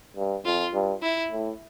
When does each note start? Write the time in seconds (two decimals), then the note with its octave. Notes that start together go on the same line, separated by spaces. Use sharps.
0.17 G2
0.45 F2 F4
0.74 G2
1.02 E4
1.31 A2